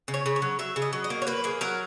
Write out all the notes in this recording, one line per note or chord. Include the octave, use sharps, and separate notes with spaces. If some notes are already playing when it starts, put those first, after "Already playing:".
C#3
C#5
C#3
C#5
F#3
F#3 E5
C#3
D#5
F#3
D#5
A#3
C#5
A#3 B4
A#3 G#4
F#3 A#4